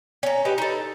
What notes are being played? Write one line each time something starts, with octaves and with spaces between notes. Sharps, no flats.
C#4 A#5
D#4 G4 B4
D#4 A4